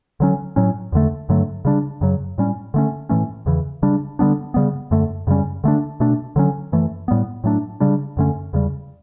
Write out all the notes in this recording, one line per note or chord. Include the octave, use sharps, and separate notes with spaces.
D3 F#3 C#4
A2 F#3 C#4
E2 D3 A3
G2 D3 F#3 A3
C#3 G3 D4
F#2 C#3 F#3
A2 G3 C#4
D3 A3 C#4
A2 E3 A3 C#4
E2 C#3 E3
C#3 G3 D4
D3 G3 B3 D4
C#3 E3 G3 B3
F#2 D3 A3
F#2 C#3 G3 C#4
D3 A3 D4
B2 A3 D4
D3 F#3 C#4
F#2 E3 A3
A2 G3 B3
A2 F#3 A3 D4
C#3 G3 D4
F#2 D3 A3 C#4
E2 C#3 G3